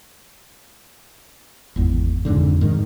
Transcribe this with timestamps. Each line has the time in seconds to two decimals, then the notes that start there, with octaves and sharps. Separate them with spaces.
1.76 G#1 E2
2.25 F2 G#2 D3
2.61 G#2 D#3